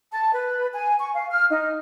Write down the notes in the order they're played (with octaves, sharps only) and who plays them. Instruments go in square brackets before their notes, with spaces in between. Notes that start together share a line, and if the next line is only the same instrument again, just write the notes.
[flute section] A5
B4
G#5
C#6
F5
F6
D#4